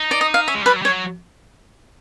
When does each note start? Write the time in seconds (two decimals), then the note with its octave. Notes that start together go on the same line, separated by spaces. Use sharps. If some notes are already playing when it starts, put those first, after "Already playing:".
Already playing: D#4
0.11 D5
0.21 D#5
0.34 F5
0.48 C#4 E5
0.55 G#3
0.62 G3 B4
0.76 F#3
0.82 G3
0.85 C#5
0.89 F#3